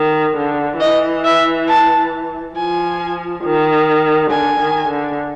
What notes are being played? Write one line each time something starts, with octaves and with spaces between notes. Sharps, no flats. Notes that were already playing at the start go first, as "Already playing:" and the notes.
Already playing: D#3
D3
E3 D#5
E5
A5
F3 G#5
D#3
D3 G#5
D#3
D3